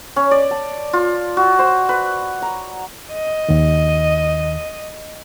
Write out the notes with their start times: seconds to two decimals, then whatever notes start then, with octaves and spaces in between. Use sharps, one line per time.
0.16 C#4
0.31 D5
0.51 A5
0.93 F4
1.37 F#4
1.59 C5
1.89 B4
2.42 A#5
3.13 D#5
3.49 D#2 D#3